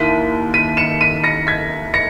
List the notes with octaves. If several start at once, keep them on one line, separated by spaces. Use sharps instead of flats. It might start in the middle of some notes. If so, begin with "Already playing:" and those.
Already playing: D#2 D#3 A#3 E4 B6 D#7
B6 D#7
C#7 E7
B6 D#7
A#6 C#7
G#6 B6
A#6 C#7